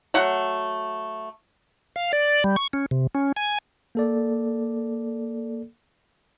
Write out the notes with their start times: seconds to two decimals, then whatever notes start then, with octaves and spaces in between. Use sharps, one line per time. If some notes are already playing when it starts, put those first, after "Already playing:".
0.14 F#3 A3 F#4 F#5
1.96 F5
2.13 D5
2.44 G3
2.56 C#6
2.73 C#4
2.91 C3
3.14 C#4
3.36 G#5
3.95 A#3 A4 D5